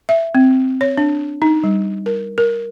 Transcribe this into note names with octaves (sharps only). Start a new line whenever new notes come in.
E5
C4
C#5
D4
D#4
G3
A#4
A#4